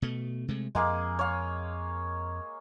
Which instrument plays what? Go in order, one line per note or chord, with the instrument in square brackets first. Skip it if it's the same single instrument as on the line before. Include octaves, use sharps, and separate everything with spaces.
[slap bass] B2 A3
C3 G#3 A3
[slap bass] F2 [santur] G#3 A#3 G#4
[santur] C#5 F5